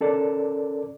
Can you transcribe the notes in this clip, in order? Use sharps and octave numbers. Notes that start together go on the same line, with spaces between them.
C#4 A4 A#4 D5